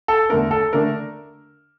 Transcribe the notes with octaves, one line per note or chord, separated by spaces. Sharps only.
A4
E2 D3 A3 D4 A#4
A4
D3 A3 D4 A#4